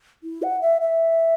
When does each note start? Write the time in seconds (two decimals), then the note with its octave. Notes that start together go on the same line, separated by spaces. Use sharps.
0.24 E4
0.43 F#5
0.62 E5
0.81 E5